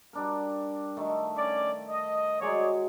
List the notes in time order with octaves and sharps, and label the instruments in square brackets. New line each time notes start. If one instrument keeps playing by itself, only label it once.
[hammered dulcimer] G3 D4 A#4
D#3 A3 A4
[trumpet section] C#4 D5
D#5
[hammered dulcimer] F#3 G#3 [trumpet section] G#4 C#5 D5